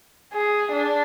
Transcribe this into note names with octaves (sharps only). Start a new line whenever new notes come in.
G#4
D4